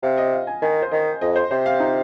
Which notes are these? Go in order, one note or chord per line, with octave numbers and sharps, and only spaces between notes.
C3 F5
D#5
F5
G#5
D#3 G#5
C5
D#3 D#5
F2 D#5
C5
C3 C5
F5
D#4